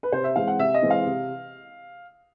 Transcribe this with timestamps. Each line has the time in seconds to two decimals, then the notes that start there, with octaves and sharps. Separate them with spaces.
0.03 B4
0.12 C3 C5
0.24 E5
0.36 E3 G#3 C4 F5
0.47 F#5
0.59 C3 E5
0.74 D#5
0.82 E3 G#3 C4
0.90 F5
1.06 C3